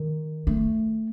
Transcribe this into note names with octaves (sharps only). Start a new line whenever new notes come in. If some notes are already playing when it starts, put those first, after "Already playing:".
Already playing: D#3
A3